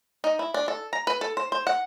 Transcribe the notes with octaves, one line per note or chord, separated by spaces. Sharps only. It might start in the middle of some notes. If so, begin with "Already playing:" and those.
D#4
E4
D4
A4
A#5
B4
A4
C5
C5
F#5